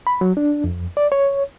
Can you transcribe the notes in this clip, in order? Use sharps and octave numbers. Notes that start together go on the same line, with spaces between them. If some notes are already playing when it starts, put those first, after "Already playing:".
B5
F#3
D4
F2
D5
C#5